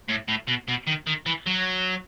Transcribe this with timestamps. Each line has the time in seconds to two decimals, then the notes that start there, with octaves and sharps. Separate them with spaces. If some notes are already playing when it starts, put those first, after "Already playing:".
0.09 A2
0.28 A2
0.47 B2
0.68 B2
0.87 D#3
1.07 D#3
1.26 E3
1.47 F#3